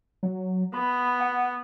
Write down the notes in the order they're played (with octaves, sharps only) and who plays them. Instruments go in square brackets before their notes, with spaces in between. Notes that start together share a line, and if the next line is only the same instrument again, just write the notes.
[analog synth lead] F#3
[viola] B3 [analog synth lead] B5
[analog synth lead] F#5